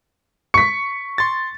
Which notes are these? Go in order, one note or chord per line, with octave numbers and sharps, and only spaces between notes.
C#6 B6 C#7
C6 A6